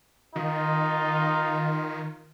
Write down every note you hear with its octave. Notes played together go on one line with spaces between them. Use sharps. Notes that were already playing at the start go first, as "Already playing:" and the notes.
D#3 D#4 F4